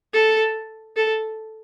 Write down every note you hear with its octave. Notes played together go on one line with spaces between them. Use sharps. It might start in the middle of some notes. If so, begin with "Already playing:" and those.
A4
A4